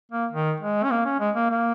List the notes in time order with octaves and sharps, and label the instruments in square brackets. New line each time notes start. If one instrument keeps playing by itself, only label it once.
[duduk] A#3
D#3
G#3
C#4
A#3
C#4
G#3
A#3
A#3